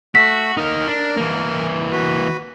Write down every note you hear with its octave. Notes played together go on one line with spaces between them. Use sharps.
A3 F#4 E6 B6
D#4 A#4 F5
D4
E3 A#3
F#4 B4